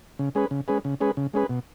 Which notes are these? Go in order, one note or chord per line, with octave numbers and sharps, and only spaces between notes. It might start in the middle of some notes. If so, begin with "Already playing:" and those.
C#3
G#3 C#4 G#4 B4
C#3
G#3 C#4 G#4 B4
C#3
G#3 C#4 G#4 B4
C#3
G#3 C#4 G#4 B4
B2